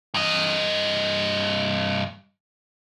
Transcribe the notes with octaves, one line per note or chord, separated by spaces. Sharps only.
G2 D#5